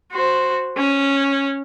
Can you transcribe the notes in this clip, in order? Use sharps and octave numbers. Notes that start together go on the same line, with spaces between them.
F#4 C5
C#4